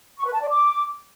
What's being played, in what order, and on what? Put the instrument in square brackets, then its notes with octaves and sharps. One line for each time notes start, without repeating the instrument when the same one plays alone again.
[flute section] C#6
B4
A5
D5
D6